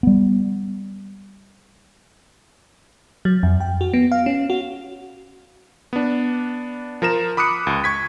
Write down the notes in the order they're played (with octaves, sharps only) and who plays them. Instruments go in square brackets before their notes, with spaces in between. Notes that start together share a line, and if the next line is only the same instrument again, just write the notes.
[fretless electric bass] G3 B3
[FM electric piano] F#3
F2
G5
F#4
B3
F5
C#4
F#4
[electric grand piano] B3 D4
F3 A#4 A#5 E7
B5 D6 D#6 F#6 C#7
C#2
C#6 G#6 B6